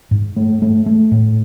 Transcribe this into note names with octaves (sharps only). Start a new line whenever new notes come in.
G#2
A3
A3
A3
A2